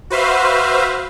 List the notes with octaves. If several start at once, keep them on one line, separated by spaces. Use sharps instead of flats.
F#4 B4 C5 E5 F5